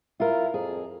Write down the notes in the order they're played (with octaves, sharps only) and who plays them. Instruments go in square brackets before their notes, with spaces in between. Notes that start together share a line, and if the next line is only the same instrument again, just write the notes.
[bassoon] E4 [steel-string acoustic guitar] F4 A#4
[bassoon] F2 [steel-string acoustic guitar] G#4